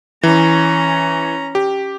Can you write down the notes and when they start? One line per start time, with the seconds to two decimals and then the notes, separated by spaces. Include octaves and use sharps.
0.23 E3 C#4 A#5
1.55 G4